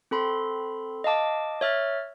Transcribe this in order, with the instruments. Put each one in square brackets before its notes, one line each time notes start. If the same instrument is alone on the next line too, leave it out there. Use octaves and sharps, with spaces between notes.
[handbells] C4 A4 B5 C6
D#5 F5 A5 D6
C#5 E5 F6 A6